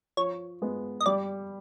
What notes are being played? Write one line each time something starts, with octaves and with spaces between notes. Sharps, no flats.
F3 C#5
G#3 B3
D#5
G3 D5